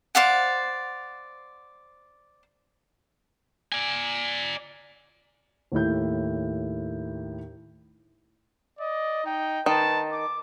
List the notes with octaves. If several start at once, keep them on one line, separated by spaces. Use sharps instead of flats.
C5 D5 F5 F#5
D5 G#5
D#2 A2 E4 G6
D5 D#5
D#4 G5
D#3 B4 A5
D6